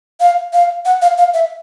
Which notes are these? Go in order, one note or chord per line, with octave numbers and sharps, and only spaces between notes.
F5
F5
F#5
F5
F5
E5